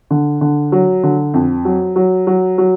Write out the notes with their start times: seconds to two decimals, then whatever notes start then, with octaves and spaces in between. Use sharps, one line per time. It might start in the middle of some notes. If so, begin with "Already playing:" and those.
0.10 D3
0.41 D3
0.72 F#3
1.03 D3
1.34 F2
1.65 F#3
1.96 F#3
2.27 F#3
2.58 F#3